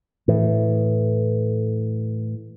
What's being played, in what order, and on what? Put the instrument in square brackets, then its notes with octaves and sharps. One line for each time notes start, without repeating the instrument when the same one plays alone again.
[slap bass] A2 E3